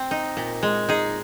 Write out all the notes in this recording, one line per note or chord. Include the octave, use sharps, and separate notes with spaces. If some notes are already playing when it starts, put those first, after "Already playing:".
Already playing: C4
D#4
A#2
G#3
D#4 G#4